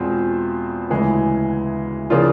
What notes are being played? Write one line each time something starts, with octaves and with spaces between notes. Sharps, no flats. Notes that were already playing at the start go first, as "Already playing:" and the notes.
Already playing: E2 B2 G#3 C4 F4
D2 C#3 E3 G#3
C#3 F3 A#3 D4 F4